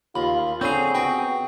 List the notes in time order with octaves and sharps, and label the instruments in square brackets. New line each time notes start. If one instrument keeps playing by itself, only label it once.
[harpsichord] D#2 [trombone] F4 [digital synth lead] B5
[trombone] D3 [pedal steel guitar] C4 G#4 [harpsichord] C#4 A#5
[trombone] B3 [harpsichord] F#4 [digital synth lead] G5